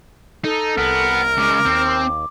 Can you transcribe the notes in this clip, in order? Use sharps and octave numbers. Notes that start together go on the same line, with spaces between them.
D#4 A4
C2 B3 A#4
C#3 G#3 D6
D#2 C4